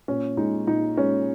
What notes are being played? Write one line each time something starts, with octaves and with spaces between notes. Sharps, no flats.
A#2 C#4
G#3 D#4
A#2 D#4
G#3 C#4